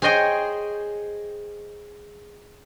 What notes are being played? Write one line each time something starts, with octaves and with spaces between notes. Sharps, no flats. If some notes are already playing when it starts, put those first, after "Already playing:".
G#4 C5 C#5 D#5 G5 G#5